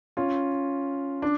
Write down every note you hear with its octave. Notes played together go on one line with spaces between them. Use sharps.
C#4 F4
D4